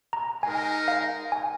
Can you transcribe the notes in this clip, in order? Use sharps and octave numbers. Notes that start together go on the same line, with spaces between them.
A#5
G#3 D#4 A#4 G#5
F5
G#5